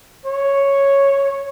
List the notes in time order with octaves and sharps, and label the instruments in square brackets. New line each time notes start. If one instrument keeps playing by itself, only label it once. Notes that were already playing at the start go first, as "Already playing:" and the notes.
[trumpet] C#5